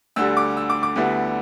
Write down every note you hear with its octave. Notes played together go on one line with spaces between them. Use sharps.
D2 D3 G3 E6
D6
E6
D6
D6
D2 D3 G3 B3 E4